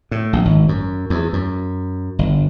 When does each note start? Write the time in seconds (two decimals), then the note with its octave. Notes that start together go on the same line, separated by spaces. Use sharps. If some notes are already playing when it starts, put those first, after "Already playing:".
0.11 A2
0.33 A#1
0.45 G#1
0.69 F#2
1.10 E2
1.33 F#2
2.19 G1